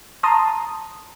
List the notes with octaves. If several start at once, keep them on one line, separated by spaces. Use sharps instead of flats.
A5 A#5 C6 D#6